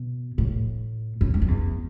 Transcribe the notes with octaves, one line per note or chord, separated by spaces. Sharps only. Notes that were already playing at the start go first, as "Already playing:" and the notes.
Already playing: B2
A2
F#2
G#2
F#2
E2